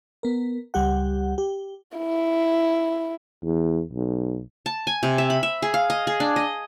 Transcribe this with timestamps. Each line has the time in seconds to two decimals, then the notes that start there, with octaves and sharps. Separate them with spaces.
0.23 B3 A#4
0.74 C#2 G3 G4 F#5
1.38 G4
1.97 E4
3.44 E2
3.93 B1
4.66 A5
4.87 G#5
5.03 C3
5.18 E5
5.30 B5
5.43 E5
5.62 G#4
5.74 F5
5.90 D#5
6.07 G#4
6.20 D4
6.36 D#5